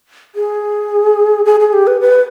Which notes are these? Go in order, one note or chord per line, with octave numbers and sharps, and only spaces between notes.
G#4
G#4
G#4
G4
B4
B4